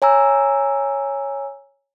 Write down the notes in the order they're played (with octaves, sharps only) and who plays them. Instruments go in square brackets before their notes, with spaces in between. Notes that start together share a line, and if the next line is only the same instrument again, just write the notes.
[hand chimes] C#5 G#5 A#5 E6